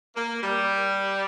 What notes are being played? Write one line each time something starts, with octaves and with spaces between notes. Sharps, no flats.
A#3
G3